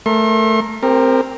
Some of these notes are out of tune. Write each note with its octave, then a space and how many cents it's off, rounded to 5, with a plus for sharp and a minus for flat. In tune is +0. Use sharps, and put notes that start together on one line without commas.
A3 +0 A#4 +0 C6 +45
C4 +0 G4 +40 A#4 -5